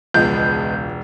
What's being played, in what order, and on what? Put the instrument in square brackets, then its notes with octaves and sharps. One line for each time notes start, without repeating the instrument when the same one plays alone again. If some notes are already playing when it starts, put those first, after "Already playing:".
[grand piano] E1 [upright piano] C#2 [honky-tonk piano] F3 G#3 B3 [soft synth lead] G6